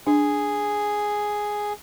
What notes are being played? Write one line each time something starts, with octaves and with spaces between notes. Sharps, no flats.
D4 G#4